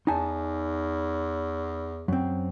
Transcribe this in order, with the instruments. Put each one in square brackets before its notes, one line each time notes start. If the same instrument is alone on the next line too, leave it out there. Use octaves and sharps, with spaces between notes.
[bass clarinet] E2 [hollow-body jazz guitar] D#4 G#5 A5
[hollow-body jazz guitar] F#2 C4